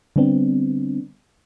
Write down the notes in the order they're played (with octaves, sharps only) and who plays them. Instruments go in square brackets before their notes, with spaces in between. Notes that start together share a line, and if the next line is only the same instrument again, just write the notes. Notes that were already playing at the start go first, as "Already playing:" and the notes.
[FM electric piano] D3 G3 B3 C4 D4